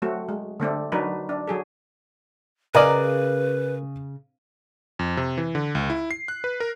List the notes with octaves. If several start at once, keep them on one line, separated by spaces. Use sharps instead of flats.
F#3 A3 C4 F#4
G#3
D3 A3 C4 D4
F#3 D4 D#4 A#4 B4
D4
F#3 G#4 A4
C#3 A#4 B4 D5 D#5 G#5
F2
C3
E3
D3
C#2
E4
C7
F#6
B4
A#4